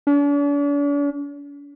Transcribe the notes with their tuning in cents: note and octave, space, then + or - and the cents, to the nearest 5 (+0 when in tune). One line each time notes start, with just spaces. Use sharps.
D4 -45